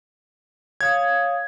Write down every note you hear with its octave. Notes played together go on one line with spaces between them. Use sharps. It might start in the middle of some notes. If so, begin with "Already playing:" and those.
C#5 F5 D#6 G#6